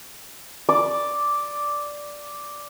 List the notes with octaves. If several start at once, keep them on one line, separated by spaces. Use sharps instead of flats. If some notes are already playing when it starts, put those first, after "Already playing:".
D5 D6